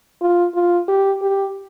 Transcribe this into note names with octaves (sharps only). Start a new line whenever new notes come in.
F4
F4
G4
G4